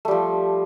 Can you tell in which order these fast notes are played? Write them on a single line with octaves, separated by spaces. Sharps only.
A3 G3 F3